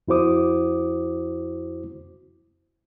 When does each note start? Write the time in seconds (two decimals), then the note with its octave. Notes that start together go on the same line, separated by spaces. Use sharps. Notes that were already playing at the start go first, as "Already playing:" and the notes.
0.08 F2 E4 F#4 C5 D6 D#6